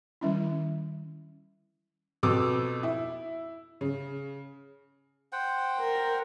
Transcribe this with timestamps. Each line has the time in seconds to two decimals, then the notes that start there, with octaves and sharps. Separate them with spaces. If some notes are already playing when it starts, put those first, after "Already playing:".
0.21 D#3 G3 C#4 E4
2.23 F2 B2 B3 D6 E6
2.83 E4
3.81 C#3
5.33 C5 F#5 G5
5.80 A#4